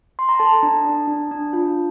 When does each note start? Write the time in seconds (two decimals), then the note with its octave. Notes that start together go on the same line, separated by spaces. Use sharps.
0.19 C6
0.29 A#5
0.39 A4 A5
0.63 D4
0.85 D4
1.07 D4
1.31 D4
1.53 F4